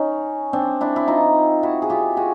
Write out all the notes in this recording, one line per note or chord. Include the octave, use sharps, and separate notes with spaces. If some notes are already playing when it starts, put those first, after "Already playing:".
Already playing: C#4 D#4
C4 D4
D4 E4
E4
D#4 F4
E4 F#4
G#4
F4 G4
F#4 G#4